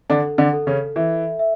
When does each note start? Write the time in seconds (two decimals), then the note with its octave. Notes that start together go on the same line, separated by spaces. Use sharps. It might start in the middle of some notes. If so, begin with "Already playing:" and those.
0.10 D3 D4 A4
0.38 D3 D4
0.53 A4
0.67 C#3 C#4
0.96 E3 E5
1.39 E5